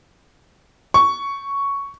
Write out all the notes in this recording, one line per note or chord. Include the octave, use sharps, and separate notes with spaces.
C#6